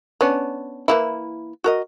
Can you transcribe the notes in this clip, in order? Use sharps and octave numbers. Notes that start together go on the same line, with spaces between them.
B3 C#4 D4
E3 A#3 E4
F#4 A#4 D#5